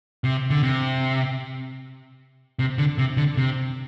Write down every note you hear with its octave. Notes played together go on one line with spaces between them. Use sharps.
C3
D3
C3
C3
D3
C3
D3
C3